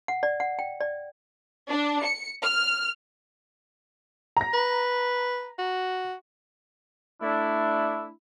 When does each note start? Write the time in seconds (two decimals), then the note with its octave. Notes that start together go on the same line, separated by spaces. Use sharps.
0.08 F#5
0.23 D5
0.40 F#5
0.59 G5
0.81 D5
1.70 D4
2.04 C#7
2.43 F6
4.37 A#5 A#6
4.54 B4
5.59 F#4
7.22 A3 D4 E4